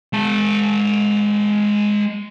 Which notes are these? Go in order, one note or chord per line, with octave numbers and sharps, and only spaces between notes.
G#3 A5